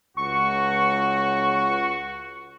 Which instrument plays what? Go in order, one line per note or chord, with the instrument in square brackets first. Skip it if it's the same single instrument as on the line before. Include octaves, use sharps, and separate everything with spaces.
[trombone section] C#2 [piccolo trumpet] F#4 [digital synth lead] C#6